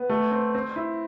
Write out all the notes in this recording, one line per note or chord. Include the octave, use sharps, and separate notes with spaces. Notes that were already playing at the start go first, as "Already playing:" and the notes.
Already playing: B3
A3
C4
C4
E4